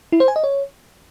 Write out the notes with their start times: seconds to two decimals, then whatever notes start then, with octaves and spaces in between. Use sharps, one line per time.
0.12 E4
0.20 C5
0.28 G#5
0.36 D#5
0.44 C#5